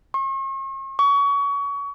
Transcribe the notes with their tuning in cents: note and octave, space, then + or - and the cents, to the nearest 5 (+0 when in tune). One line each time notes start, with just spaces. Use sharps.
C#6 -45
C#6 +30